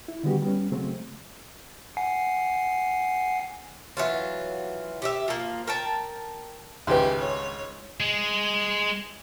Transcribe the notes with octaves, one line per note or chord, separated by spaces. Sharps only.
E4
D3 D#3 G3 B3 F#4 G4
G3 B3 C#4
C#3 F#3 G#3 A3 C4
F#5 G#5 C7
E3 F#3 F4
G4 D#5 E5
F3 A#3
A#4 G5 A5
G#1 C#2 G4 B4 E5 G#5 C6
C#5
G#3